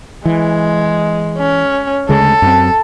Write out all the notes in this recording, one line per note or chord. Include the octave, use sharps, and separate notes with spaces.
E3 G#3
C#4
D2 C#3 G#3 A4
F#2 C4